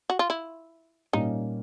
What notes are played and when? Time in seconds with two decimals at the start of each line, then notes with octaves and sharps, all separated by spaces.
0.10 F#4
0.19 F4
0.30 E4
1.13 A#2 G3 A#3 C#4 D#4